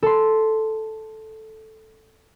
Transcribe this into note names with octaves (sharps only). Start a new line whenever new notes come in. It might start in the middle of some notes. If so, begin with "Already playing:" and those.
A4 C6